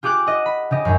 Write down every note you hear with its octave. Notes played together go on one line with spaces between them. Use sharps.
F4 G4 G#4 D6 F#6 D7
D#5 F#5
B5
C#3 G4 D#5
G#1 F#2